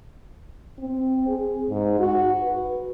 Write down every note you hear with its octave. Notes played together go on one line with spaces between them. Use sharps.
C4
G#4
G#2
F#4
B4